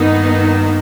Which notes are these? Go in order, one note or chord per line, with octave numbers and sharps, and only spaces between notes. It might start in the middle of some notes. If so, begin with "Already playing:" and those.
Already playing: G2 D#3 A#3 B3 D#4